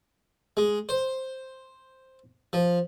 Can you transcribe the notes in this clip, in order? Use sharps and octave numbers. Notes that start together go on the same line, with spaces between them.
G#3
C5
F3